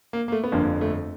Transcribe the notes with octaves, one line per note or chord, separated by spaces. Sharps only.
A#3
A#3
A3
B3
G1 F2 D3 A#3
A3